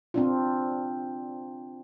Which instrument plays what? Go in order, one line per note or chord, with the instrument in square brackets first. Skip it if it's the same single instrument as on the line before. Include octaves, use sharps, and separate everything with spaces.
[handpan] C4 D4 F4